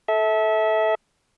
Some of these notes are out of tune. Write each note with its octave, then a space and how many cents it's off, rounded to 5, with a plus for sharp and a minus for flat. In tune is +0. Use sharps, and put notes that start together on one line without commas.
A4 -15 E5 -25